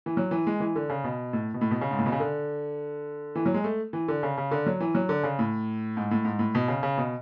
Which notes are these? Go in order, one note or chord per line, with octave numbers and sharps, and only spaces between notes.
E3
F#3
E3
G#3
E3
D3
C#3
B2
A2
B2
A2
B2
C#3
G#2
A2
B2
C#3
D3
E3
F#3
G#3
A3
E3
D3
C#3
C#3
D3
F#3
E3
F#3
D3
C#3
A2
G#2
A2
G#2
A2
B2
C#3
C#3
B2